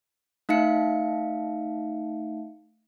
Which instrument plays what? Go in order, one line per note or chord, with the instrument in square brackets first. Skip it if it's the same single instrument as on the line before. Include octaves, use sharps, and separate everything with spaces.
[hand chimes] A3 D#4 E5 F5 C#7